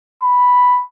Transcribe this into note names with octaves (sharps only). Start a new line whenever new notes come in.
B5